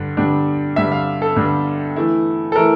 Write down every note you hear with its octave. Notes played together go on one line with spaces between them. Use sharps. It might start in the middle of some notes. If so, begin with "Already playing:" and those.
Already playing: G2 D3 D4
G2 D3 G3 D4
G2 D3 G3 D4 E5
F5
A4
G2 D3 G3 D4
E3 A3 E4
A4
E3 A3 E4 A#4